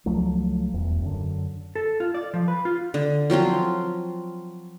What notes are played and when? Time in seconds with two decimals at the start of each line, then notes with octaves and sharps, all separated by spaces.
0.06 C#2 F3 F#3 A3
0.74 D#1 E2
1.02 F#2 D3
1.75 A4
2.00 F4
2.14 D5
2.34 F3
2.48 B4
2.65 F4
2.94 D3
3.30 F3 F#3 C4 F4